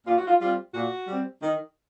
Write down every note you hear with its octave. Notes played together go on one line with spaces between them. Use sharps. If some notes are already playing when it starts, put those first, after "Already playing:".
A#2 F4
F#4
F4
G3 C4 F4
A#2 F#4
G3 C4
D#3